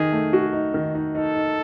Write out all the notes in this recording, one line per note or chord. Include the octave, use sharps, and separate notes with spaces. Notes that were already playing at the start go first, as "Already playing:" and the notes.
Already playing: D#3 D#4 G#4
A3
F#4
D#4
D#3
D#4
D#4 A4
D#4